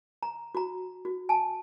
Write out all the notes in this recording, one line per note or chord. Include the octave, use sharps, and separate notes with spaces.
A#5
F#4 A#5
F#4
G#5 A5